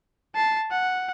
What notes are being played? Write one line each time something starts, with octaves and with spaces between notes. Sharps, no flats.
A5 C7
F#5